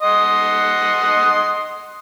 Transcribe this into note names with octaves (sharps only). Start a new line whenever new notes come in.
D#5 F#5 C6